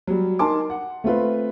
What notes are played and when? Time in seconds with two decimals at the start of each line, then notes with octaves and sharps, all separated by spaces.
0.07 F#3 G3
0.39 D#4 A#4 G#5 A5 C6 D6
0.70 F#5
1.04 A3 C4 F4 B4